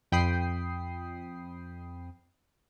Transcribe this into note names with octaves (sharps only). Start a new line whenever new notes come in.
F2 G5 B5 D#6 C7